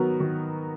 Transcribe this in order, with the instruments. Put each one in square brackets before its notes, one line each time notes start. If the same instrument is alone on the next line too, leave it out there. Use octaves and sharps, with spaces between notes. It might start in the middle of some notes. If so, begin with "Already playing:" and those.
Already playing: [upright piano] D#3 F#3 B3 F#4 A#4
D#3